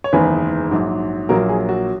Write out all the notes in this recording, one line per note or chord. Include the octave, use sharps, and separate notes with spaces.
C#5
F#1 E2 D#3 G#3 G#4 B4
A#1 G#2 F#3
A#1 A#2 F#3 A#3 F#4 A#4
G#4
F#4